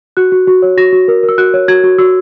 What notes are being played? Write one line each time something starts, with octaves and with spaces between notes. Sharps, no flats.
F#4 F#6
F#4
F#4
C#5
F#4 A#6
F#4
A#4
A#4
E6
F#4 F#6
C#5
F#4 G#6
F#4
F#4 E6